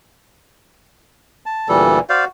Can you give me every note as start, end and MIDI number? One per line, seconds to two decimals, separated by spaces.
1.46 1.68 81
1.69 2.00 38
1.69 2.00 46
1.69 2.00 52
1.69 1.99 55
1.69 1.99 69
2.09 2.27 66
2.09 2.25 72
2.09 2.25 74
2.09 2.25 77